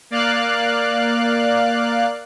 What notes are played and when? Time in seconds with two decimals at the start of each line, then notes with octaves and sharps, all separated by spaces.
0.10 A#3 D5 F5 F#6